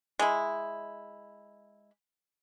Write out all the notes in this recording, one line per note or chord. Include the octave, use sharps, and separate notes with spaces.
G#3 E4